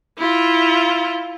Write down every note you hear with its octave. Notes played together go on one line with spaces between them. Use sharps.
E4 F4